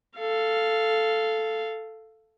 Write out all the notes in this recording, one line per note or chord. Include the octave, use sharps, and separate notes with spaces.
A4 F5